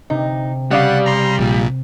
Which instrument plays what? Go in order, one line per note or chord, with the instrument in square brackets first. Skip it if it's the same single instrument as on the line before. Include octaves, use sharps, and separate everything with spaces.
[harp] C3 [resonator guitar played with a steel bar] D#4
[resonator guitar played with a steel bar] C#3 D5 F5 [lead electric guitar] G3 [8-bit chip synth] F#5
[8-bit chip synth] A#5 C6
A#1 A#2